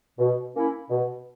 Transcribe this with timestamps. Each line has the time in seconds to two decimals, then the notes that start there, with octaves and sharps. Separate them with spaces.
0.19 B2
0.54 A#3 C#4 E4
0.89 B2